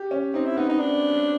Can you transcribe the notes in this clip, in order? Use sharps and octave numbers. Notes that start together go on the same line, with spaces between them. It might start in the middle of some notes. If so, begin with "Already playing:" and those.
Already playing: G4
C#4
C4 D#4
E4
B3 D#4
D#4
D4